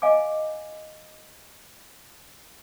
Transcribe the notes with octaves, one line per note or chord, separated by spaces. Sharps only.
D#5 F5 G#5 D6